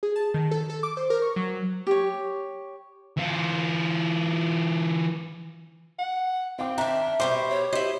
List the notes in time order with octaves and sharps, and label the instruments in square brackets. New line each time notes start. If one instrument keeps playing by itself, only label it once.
[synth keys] G#4
A5
D#3
A4
A4
D6
C5
A#4
C#6
F#3
[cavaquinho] G4 C#5
[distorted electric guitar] E3 F4
[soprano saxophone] F#5
[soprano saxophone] C4 [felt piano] F5 D6 [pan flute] G5
[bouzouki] D#3 D4 [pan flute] E5 [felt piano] A#5
[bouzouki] B2 D#3 G3 [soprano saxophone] C5 [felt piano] D6
[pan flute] C#5
[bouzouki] E4 D#5 [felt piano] G4 [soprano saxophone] C5